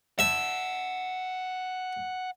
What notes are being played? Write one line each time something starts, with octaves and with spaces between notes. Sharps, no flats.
E5 F#5 A5